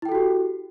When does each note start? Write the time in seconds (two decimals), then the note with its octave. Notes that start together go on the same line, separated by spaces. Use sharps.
0.02 E4
0.05 G5
0.09 A4
0.12 F#4
0.15 G4